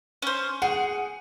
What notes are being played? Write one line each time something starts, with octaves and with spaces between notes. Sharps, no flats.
C#4 C5
G#4 F#5